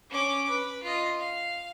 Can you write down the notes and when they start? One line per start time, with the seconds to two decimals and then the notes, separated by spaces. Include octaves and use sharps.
0.10 C#4 D6
0.49 B4
0.83 F4 D#5
1.20 F5